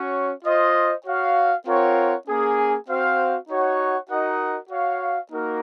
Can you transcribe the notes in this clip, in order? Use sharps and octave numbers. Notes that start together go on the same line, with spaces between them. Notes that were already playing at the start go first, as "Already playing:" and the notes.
Already playing: C#4 F#4 C#5
F4 C5 D#5
F#4 C#5 F5
C4 F4 A#4 C#5 F#5
A#3 C#4 G#4
C4 F#4 C5 F5
D#4 F#4 C#5 F#5
D#4 F#4 A#4 D#5 F#5
F#4 C#5 F5
A#3 D#4 F#4 A#4